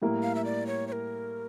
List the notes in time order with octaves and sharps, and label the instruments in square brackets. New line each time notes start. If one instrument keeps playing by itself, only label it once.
[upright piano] A2 G3 A#3 E4
[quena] F5
E5
D5
C#5
C#5
A#4